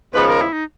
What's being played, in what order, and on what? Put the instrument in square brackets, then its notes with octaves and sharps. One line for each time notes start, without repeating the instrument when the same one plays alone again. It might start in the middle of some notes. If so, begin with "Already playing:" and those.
[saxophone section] D#2 C#3 F3 G#3 B3 [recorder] B4
[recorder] A#4
E4
D#4